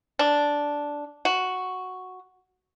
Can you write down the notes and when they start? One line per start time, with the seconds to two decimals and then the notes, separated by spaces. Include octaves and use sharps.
0.19 D4
1.25 F#4